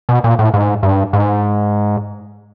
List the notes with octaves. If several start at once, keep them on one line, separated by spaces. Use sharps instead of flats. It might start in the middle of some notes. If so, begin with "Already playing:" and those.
B2
A#2
A2
G#2
G2
G#2